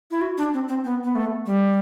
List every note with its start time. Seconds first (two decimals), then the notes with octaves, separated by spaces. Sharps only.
0.11 E4
0.21 F#4
0.38 D4
0.54 C4
0.69 C4
0.85 B3
1.04 B3
1.15 A3
1.46 G3